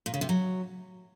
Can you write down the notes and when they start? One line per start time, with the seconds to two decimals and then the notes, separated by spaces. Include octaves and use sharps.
0.06 A#2
0.14 C#3
0.21 C3
0.29 F#3